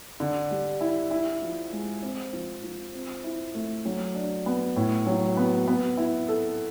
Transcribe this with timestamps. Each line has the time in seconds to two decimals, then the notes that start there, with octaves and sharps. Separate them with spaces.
0.20 D3
0.51 G3
0.81 E4
1.11 E4
1.42 F3
1.72 G#3
2.02 C4
2.33 F3
2.63 F3
2.94 C4
3.24 E4
3.54 A3
3.85 F#3
4.15 D4
4.46 B3
4.76 A2
5.07 F#3
5.37 B3
5.68 B3
5.97 E4
6.28 A4